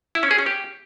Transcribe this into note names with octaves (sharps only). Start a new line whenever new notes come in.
E4
C#4
G#4
C#4
G4